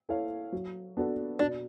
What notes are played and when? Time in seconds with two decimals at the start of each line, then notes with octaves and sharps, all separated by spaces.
0.09 E4 A4 C#5 F5
0.52 F#3
0.97 B3 D4 F#4 A4
1.39 B2 D4